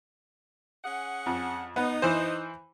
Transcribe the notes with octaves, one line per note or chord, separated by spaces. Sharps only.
C#4 G#4 F#5
F2
B3 D#4
E3 C5